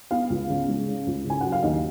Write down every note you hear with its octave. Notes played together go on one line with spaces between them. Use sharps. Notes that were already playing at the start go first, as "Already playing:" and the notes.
B3 F5
C#2
C#3
G#3
C#4
C#2
C#3 G#5
F#3 F#5
F5
D#2 D#5